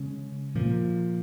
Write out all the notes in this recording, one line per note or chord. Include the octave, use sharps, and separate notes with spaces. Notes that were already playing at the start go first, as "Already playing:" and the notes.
Already playing: C#3 G#3 C#4
A#2 F3 A#3